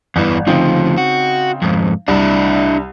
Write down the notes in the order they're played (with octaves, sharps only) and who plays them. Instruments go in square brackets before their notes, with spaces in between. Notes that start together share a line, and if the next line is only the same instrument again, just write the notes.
[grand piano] G1 [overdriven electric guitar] E2 E3
[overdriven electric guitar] D2 F3 [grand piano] C#3 C4 D#4
[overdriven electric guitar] F#4
F2 G#2
[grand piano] C2 [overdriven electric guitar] D4 E4